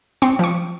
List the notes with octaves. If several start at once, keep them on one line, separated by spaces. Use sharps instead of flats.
C4 C#6
F3 C#6